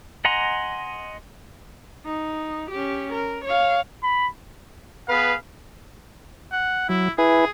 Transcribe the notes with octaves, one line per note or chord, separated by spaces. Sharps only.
D#5 F#5 G#5 A#5 C6
D#4
C#4 G4
A#4
C#5 F5
B5
B3 G#4 B4 F5
F#5
F#3 E4
E4 G#4 B4 G#5